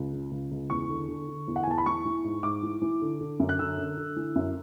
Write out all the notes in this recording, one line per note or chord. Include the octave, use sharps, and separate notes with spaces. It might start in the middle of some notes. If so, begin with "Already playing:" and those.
Already playing: C#2
C#3
C#2
C#2
E2 C#6
D3
D3
D3
E2
F#5
G#5
E2 A5
B5
E3 C#6
E3
G#2
G#2 D6
E3
E3
D3
D3
F#2
F#6
D3 E6
D3
D3
E3
F#2